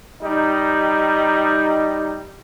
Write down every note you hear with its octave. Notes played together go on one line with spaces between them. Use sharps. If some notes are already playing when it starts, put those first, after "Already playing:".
G3 D#4